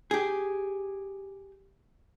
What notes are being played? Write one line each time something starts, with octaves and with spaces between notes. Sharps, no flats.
G4 G#4